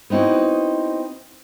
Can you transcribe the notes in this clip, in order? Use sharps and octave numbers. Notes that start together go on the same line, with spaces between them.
B3 C4 D#4 E4 F#4